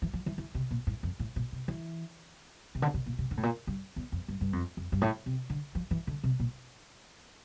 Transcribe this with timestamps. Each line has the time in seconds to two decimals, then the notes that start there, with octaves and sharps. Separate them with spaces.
0.02 E3
0.13 F3
0.26 E3
0.38 E3
0.55 C3
0.71 A#2
0.87 A2
1.03 F2
1.20 A2
1.36 A#2
1.52 C3
1.68 E3
2.75 C3
2.82 D3
2.94 C3
3.06 A#2
3.18 C3
3.31 D3
3.37 A2
3.43 A#2
3.67 G2
3.96 E2
4.12 F2
4.28 G2
4.41 G2
4.53 F2
4.77 F2
4.92 G2
5.01 A2
5.26 C3
5.50 D3
5.75 F3
5.91 E3
6.07 D3
6.24 C3
6.40 A#2